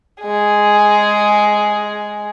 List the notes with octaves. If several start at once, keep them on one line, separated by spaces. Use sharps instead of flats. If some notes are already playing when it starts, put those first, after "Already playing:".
G#3 G#4